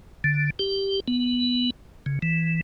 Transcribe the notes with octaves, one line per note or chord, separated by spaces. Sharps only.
D3
G4
B3
C#3
E3